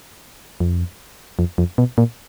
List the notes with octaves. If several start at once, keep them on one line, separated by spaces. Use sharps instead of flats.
F2
F2
F2
B2
A#2